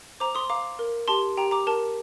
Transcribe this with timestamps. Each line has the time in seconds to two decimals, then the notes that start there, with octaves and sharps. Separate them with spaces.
0.20 C5 A#5 D6
0.35 C6 D#6
0.49 F5 A#5 D6
0.79 A#4
1.08 G4 A5 C6
1.37 G4 G5 A#5
1.51 A#5 D6
1.67 A#4 A5